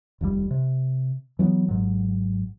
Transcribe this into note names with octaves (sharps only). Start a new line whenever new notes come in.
F1 D#2 C3 G3
C3
E3 F#3 A3 B3
G#1 G#2 F#3